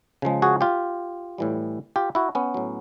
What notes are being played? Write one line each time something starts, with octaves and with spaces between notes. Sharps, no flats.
C#3 F3 G#3
F#4 G#4
F4 G4
A2 E3 G3
F4 G4
E4 F#4
B3 C#4
A2 F#3